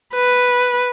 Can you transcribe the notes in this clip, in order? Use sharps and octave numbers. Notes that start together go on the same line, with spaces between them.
B4